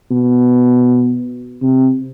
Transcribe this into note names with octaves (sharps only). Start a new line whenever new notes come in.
B2
C3